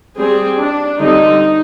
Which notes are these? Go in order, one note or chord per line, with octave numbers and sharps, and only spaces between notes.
G3 C4 G#4
D4
D3 G3 C4 D#4